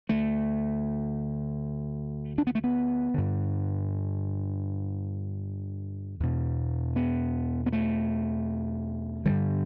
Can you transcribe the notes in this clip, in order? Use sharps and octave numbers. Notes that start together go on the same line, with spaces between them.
D2 D3 A3
D4
B3
A3
B3
G2 D3
E2 B2
B3
B3
A3
G2 D3 G3